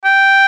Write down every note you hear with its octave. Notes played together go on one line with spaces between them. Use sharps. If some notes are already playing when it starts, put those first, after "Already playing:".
G5